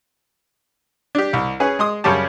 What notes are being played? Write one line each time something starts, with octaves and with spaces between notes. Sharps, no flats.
D4 G4
C2
C#4 G#4 B4
G#3 C6 D#6
F#2 C#3 G3 C#4 G4 A5